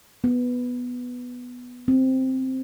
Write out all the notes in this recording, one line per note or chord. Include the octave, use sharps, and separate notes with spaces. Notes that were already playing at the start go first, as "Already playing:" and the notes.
B3
C4